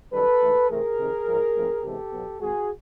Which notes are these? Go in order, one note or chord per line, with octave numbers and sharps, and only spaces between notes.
F#2 D#3 G3 A4 B4
G#2 E3 A3
C3 E3 A3 C4 G#4 A#4
F2 C3 D#3
G#2 F3 G#3
G#2 F3 A3 C4
C3 E3 G#3 B3 G4 A4
B2 F#3 B3
G#2 D#3 G#3 C4 F#4 G#4